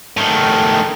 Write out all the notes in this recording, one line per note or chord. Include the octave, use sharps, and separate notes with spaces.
A2 D#3